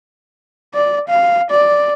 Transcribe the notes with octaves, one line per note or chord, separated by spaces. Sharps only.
D5
F5
D5